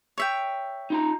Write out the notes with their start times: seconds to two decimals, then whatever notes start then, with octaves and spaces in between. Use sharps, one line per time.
0.18 C#5 E5 G5
0.90 D#4 F4 A#5